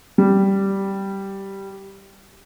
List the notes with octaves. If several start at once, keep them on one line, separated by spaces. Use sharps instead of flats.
G3